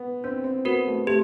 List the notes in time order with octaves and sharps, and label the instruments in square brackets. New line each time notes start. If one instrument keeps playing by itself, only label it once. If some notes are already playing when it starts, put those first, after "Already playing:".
Already playing: [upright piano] B3
[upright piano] C4 [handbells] D4
[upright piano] C4
[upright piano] B3 [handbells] F#4 A#4
[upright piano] A3
[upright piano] A3 [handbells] G4